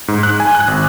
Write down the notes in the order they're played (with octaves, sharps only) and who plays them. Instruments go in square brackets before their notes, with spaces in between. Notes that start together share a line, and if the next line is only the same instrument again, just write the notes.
[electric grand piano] G#2
F#6
G#5
F#6
G#1